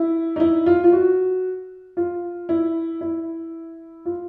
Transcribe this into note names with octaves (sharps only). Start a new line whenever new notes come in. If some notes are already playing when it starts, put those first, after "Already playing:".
Already playing: E4
D#4
E4
F4
F4
F#4
F4
E4
E4
F4